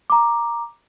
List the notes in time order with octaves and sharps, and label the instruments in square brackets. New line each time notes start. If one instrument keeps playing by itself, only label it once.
[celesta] A#5 D6